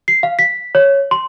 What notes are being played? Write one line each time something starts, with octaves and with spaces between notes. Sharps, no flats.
C7
F5
B6
C#5
C6